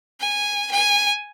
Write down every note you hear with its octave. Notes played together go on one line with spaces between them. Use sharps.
G#5
G#5